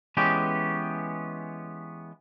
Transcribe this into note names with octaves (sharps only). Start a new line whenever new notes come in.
E3 G#3 B3 C#4 G4